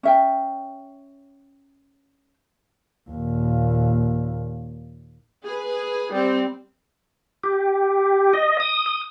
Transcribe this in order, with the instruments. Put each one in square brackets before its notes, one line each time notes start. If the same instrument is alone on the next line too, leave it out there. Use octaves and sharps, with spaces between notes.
[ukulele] C#4 E5 G5
[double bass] D#2 A#2
[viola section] G#4 B4
G3 C4
[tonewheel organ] G4
D#5
D#6
D#6